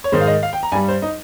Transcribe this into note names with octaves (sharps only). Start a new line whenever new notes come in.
C#5
G#2 D#3 G#3 C5
F5
D#5
F5
G5
A#5
G2 G3 G#5
C5
D#4